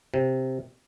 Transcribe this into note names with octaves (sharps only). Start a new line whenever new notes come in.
C3